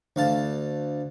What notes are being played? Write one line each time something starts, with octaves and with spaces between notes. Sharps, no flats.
D2 F5 A5